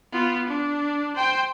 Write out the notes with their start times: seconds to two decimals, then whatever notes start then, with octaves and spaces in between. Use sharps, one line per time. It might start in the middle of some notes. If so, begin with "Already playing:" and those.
0.13 B3 F4
0.48 D4
1.16 C5 G5